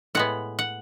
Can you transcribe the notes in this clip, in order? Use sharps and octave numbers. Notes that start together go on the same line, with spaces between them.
A2 G#3 B3 F#5
F#5